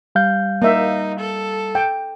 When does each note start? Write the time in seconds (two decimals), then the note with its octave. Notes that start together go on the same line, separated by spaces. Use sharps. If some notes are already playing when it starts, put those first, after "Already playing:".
0.15 G3 F5 G6
0.62 A#3 D#4 E5
1.19 A4
1.75 G5